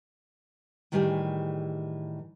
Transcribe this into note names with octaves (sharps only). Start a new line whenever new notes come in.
A2 D#3 E3 G3 G4 G#4